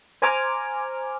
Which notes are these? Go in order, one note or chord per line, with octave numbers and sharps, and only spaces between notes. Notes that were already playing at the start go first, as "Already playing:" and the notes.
C5 G#5 A#5 D6 F6